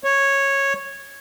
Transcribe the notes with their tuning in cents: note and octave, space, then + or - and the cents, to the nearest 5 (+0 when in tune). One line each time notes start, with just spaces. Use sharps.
C#5 -10